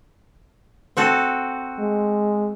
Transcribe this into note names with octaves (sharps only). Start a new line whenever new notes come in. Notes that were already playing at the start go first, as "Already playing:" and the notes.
C4 F#4 A4
G#3